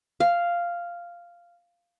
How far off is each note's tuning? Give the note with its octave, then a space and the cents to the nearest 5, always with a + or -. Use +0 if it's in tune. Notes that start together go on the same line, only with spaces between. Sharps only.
F5 -5